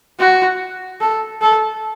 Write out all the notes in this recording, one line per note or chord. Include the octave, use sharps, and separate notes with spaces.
F#4
A4
A4